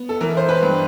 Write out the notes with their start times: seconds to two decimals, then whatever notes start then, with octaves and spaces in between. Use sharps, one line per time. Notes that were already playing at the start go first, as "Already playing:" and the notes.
Already playing: B3
0.09 A4
0.21 E3 A#4
0.37 C5
0.49 B4
0.63 G2